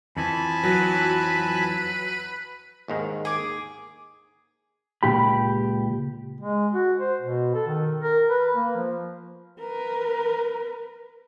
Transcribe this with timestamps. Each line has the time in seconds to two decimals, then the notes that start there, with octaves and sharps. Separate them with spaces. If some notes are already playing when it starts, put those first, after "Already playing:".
0.17 F2 E3 F3 G#5 A5 B5
0.64 F#3 B4
2.88 D#2 G#2 D#3
3.25 G#4 D6
5.03 C#2 G2 A#2 G4 B5
6.41 G#3
6.74 F#4
6.99 C5
7.21 B2
7.55 A4
7.67 D#3
8.01 A#4
8.30 B4
8.55 A#3
8.76 F3
9.59 A#4 B4